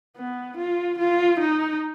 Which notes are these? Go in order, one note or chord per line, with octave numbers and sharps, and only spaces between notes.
B3
F4
F4
D#4